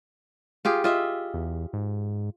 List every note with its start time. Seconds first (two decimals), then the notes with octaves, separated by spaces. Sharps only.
0.65 F4 G4 G#4
0.84 F4 D#5 E5
1.34 E2
1.73 G#2